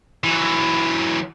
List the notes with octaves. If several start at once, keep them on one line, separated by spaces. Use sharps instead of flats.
E3 F#3